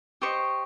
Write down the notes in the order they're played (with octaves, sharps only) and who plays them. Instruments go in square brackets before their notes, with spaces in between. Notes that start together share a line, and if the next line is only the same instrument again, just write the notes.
[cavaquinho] G4 C5 D#5 C#6